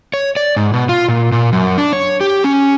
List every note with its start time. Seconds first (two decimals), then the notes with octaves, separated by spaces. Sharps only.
0.14 C#5
0.37 D5
0.56 G#2
0.74 B2
0.89 F4
1.09 A#2
1.32 A#2
1.53 F#2
1.78 D4
1.93 C#5
2.21 G4
2.44 C#4